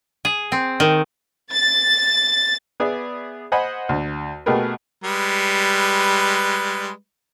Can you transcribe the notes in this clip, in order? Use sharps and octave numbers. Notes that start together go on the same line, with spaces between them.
G#4
C4
D#3
A6
B3 G#4 D5 E5 B5
C5 D#5 F#5 G#5 B5
D2
B2 A3 G4 G#4 A#4 B4
G3 G#3 B4